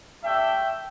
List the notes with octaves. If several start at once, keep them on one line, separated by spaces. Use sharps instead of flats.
A3 D4 G4 E5 G5